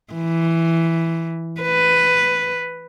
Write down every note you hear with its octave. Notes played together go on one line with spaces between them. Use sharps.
E3
B4